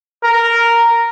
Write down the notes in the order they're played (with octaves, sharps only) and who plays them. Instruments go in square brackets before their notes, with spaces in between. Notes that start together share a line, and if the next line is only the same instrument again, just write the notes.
[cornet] A#4